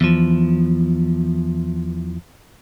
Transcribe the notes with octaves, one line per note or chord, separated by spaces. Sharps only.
E2 F3